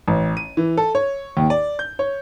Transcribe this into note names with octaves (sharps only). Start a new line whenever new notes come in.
A1
D#7
E3
A4
C#5
D#2
D5
G6
C#5